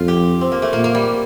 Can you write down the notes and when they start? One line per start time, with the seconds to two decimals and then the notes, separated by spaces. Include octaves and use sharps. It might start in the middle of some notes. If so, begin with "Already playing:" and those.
Already playing: F2 F4
0.08 G4
0.41 C4
0.52 A#3
0.62 A3
0.73 A#2 A#3
0.84 A#3
0.95 G3